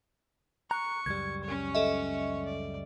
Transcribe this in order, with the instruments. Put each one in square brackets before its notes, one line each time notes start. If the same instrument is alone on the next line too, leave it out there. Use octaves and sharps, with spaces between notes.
[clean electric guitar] A#5 [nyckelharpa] C#6 [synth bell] F#6
[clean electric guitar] C#2 F#2 G3 [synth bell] G#6
[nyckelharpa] C#4 C#5
[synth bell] A4 D#5 E5
[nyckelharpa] D5